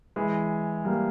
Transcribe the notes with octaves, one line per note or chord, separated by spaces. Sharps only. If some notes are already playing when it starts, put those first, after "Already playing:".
E3 G#3
G3 A#3